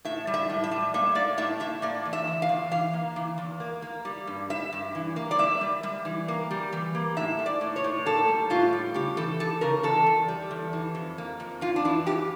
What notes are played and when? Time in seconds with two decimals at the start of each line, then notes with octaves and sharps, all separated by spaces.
0.05 A2 E5
0.27 G3
0.34 E5
0.50 A2
0.64 E5
0.71 G3
0.94 A#3 E5
1.15 A#3 D5
1.38 A2 E5
1.60 A2 E5
1.82 A#3 D5
2.05 E2
2.13 E5
2.27 E3
2.42 F5
2.49 E2
2.71 E3 F5
2.93 A#3
3.16 E3
3.38 E2
3.60 A#3
3.82 A#3
4.05 G3
4.27 G2
4.50 G3 E5
4.73 G2
4.95 E3
5.16 A#3
5.31 D5
5.39 G3 E5
5.61 G3
5.83 G3
6.05 E3
6.28 A#3
6.51 G3
6.72 E3
6.95 A#3
7.17 A2 E5
7.39 A2
7.46 D5
7.61 A2
7.76 C#5
7.84 A2
8.06 A#3 A4
8.28 G3
8.50 A2 F4
8.73 G3
8.94 C#3 G4
9.17 E3 A4
9.40 E3 A4
9.61 C#3 A#4
9.83 E2 A4
10.07 E2
10.28 G3
10.51 E2
10.73 E3
10.95 F2
11.18 A#3
11.40 F2
11.61 F2 F4
11.76 D4
11.85 E3 E4
12.06 F2 G4